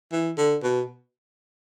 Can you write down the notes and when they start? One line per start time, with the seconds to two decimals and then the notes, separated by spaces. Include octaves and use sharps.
0.12 E3
0.37 D3
0.63 B2